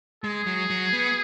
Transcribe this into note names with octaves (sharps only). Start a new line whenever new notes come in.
G#3 G#4
F#3
F#3
B3